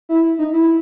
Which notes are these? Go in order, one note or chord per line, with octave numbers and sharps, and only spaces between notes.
E4
D#4
E4